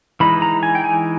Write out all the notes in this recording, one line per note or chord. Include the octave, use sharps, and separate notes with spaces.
E3 G#3 D#4 B5
A#5
G#5
G5
G#5